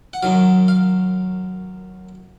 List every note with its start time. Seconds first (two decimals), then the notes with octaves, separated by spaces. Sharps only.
0.13 F#5
0.23 F#2 D#3 F#3 F5
0.68 F5